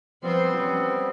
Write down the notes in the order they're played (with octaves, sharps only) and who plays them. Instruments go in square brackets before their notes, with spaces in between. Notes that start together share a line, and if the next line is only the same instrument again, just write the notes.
[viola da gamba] F3 C5 [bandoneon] G3 B3 C4
[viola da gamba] C#4